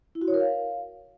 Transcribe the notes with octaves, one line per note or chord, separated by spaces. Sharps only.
E4
F#4
C#5
A#4
F5